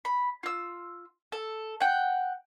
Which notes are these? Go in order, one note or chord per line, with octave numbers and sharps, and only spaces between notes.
B5
F4 E6
A4
F#5 G5